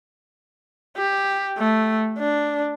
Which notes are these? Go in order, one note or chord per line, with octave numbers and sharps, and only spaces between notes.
G4
A3
D4